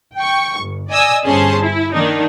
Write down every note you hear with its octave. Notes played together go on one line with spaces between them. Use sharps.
G5 C#6
G1
D5 D#5 G#5 D#6 E6
G1 C#4 G#4 C5 A5 C6
E4
D#3 A#3 D4 D#4